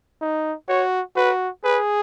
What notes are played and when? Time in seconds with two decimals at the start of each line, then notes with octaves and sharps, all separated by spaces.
0.21 D#4
0.68 F#4 C#5
1.16 F#4 B4
1.64 G#4 B4